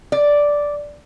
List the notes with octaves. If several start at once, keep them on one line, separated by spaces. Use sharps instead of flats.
D5